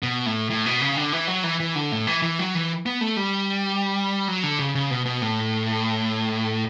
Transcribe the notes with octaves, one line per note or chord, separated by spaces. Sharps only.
B2
A2
A2
B2
C#3
D3
E3
F#3
E3
E3
D3
A2
E3
E3
F#3
E3
B3
A3
G3
F#3
D3
C#3
C#3
B2
B2
A2